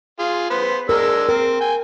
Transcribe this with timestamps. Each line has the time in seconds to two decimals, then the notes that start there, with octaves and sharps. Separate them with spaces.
0.19 F4 G#4
0.50 B3 C5
0.89 G#3 D4 A#4 E6
1.29 C4 A#4
1.61 G5 G#5